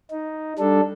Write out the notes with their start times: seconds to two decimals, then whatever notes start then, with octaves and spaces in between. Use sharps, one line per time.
0.10 D#4
0.59 G3 D4 A4